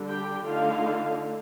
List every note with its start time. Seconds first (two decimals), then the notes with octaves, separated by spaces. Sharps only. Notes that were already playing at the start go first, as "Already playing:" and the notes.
Already playing: D3 G3 D4
0.09 G4 G5
0.45 D3 A3 D#4 F4 F5